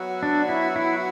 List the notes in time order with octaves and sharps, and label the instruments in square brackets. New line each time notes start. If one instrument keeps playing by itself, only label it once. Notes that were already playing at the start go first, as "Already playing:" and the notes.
Already playing: [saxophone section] F#3 B3 F#4 C#5 E5
[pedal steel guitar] D4
E4
E4